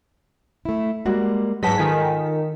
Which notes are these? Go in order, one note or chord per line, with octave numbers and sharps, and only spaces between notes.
A3 E4
G3 G#3 A#3 F#4
G#2 F#3 B4 C#5 D#5 F#5 A5 B6
D#3 F4 A4 F#5 G#5